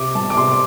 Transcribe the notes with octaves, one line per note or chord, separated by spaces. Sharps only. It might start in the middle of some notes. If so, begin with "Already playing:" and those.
Already playing: C3 D6
G3 A5
D6
C3 C6
D6